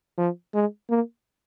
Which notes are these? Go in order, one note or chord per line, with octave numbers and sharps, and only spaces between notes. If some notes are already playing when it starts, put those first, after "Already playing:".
F3
G#3
A#3